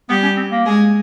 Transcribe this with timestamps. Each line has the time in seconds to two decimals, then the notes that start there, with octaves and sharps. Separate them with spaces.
0.09 G3 B3 G4
0.23 C#4
0.36 C4
0.51 A#3
0.65 G#3 G#4